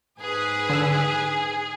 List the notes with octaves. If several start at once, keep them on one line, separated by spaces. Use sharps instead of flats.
G#2 G#4 B4
D3 E6